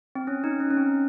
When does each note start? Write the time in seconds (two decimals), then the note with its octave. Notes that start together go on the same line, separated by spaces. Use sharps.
0.15 C4
0.27 C#4
0.44 D#4
0.60 C#4
0.70 C#4
0.77 C4